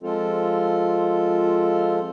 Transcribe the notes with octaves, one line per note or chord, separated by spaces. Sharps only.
F3 G#3 C4 F4 A4